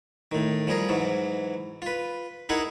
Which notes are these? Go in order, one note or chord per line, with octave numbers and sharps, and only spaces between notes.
A2 D#3
F3 G3 G#4 A#4
G#2 E3 F#3
F4 B4
D#4 E4 G#4 A#4 F#5 G#5